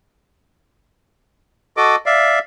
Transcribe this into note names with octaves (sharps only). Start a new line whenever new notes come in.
F#4 A4 D#5 D6
D5 E5 F5